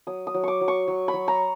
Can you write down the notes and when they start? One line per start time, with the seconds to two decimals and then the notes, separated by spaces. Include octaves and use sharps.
0.07 F#3 D#6
0.27 D#6
0.34 F#3
0.43 C#6 D6
0.61 F#3
0.68 C#6
0.88 F#3
1.08 B5
1.14 F#3
1.28 A#5